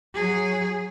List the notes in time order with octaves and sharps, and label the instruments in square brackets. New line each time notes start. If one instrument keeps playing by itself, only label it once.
[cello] F#3 G#4